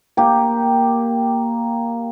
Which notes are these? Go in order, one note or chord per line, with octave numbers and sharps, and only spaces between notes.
A#3 G4